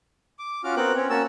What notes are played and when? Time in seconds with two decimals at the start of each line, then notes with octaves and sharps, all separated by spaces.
0.39 D6
0.64 C#4 F4 F#4 D6 F6
0.77 B3 C4 F#4 A#4 G5 F#6
0.96 C4 C#4 C#5
1.10 A#3 C#4 F#4 A5 E6